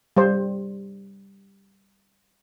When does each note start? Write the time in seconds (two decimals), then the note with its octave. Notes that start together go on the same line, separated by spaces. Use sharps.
0.17 G3 C5